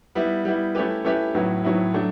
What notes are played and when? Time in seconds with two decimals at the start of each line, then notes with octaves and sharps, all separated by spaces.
0.15 G3 B3 E4
0.45 G3 B3 E4
0.75 A3 C#4 E4 G4 B4
1.05 A3 C#4 E4 G4 B4
1.35 A2 F#3 B3 E4
1.64 A2 F#3 B3 E4
1.94 F#3 A3 D4